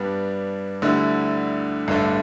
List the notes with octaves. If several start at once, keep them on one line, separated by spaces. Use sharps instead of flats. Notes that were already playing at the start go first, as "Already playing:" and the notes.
Already playing: G2 G3 B3 D4
D2 D3 G3 E4
A1 G2 D3 A3